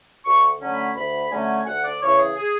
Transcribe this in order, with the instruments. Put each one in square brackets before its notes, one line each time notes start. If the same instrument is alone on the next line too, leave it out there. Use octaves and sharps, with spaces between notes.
[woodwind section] D2 C#6
D3 F#3 A3 C#4
B5
D2 B5
D3 F#3 A3 C#4 G#5
D2 F#5
D5
C#3 E3 C#5
G#4
G#4